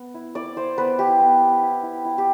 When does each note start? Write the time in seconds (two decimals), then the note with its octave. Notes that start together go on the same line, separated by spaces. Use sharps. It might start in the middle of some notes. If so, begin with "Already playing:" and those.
Already playing: B3
0.14 E4
0.35 E4 D5
0.56 E4 C5
0.78 B3 B4
0.99 E4 G4
1.20 B3
1.41 B3
1.62 E4
1.83 E4
2.05 E4
2.18 G4